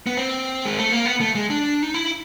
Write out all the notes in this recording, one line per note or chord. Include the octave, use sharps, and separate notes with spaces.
B3
C4
G#3
A3
A#3
B3
A3
G#3
D4
D#4
E4